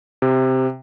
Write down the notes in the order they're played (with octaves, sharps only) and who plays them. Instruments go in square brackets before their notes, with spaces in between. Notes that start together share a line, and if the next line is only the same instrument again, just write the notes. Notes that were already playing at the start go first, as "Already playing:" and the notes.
[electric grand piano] C3